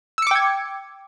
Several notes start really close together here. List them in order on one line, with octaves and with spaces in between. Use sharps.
E6 C#7 D6 G5 G#6